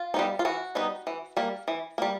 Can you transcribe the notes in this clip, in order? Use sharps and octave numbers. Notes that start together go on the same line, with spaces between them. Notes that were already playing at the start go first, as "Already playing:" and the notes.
Already playing: F4
G3 B3 D#4
F4
E3 F#4
G3 B3 D#4
E3
G3 A#3
E3
G3 A#3